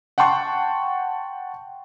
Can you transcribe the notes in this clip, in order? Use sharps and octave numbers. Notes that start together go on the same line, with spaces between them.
F#5 G5 A5 C6 C#6